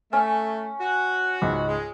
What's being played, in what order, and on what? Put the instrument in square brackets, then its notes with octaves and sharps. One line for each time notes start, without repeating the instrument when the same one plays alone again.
[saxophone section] A3 [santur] C#4
[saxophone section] F#4
[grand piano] C#2 G#2
[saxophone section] G#3